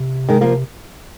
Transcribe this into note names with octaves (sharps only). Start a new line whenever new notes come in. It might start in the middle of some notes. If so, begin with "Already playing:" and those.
Already playing: C3
D#3 G#3
F3 A#3